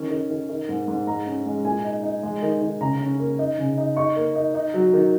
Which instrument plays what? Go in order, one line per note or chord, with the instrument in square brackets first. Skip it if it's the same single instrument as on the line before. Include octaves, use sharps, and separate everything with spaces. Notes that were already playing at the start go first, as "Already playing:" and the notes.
Already playing: [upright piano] D#3 C#4
D#3
D#3
D#3
G#2
G#2
G#3 A#5
C#4
G#3
A#2 G#5
D#4
D#4
G#3
D#3
D#3
C#3 A#5
C#4
A#3
D#4
C#3
D#4
D#4 C#6
A#3
D#4
D#4
F#3
D#3